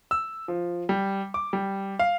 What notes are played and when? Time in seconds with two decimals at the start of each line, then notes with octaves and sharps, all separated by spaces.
0.11 E6
0.48 F3
0.89 G3
1.34 D6
1.53 G3
1.99 F5